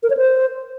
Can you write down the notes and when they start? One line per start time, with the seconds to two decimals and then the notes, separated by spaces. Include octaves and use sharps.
0.03 A#4
0.10 C#5
0.17 C5